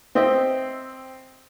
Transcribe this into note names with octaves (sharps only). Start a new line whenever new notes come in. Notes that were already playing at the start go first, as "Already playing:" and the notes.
C4 C5 D#5 E5